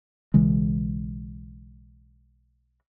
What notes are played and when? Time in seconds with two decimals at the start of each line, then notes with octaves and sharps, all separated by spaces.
0.34 B1 C#3 E3 G#3